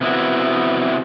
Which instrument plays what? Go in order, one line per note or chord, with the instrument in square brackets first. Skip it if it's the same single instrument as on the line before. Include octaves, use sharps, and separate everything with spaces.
[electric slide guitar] C3 B3 E4 F#4